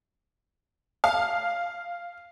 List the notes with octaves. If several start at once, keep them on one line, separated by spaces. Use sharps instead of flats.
F5